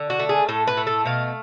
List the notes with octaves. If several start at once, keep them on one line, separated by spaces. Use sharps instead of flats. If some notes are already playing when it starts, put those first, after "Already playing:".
Already playing: D3
F#4
A3
G#4
A2 A4
B4
A3
A4
B2 F5